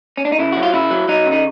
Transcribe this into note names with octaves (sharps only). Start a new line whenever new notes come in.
C#4
D4
D#4
C#3 E4
F#3 F#4
F4
C#3 E4
F#3
F#3 D#4
C#3
D#4